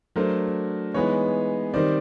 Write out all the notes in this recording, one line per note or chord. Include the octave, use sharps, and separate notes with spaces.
F#3 A3 D4 A#4 C5
E3 G#3 B3 D#4 B4 C#5
D#3 G3 C4 D#4 C5 D5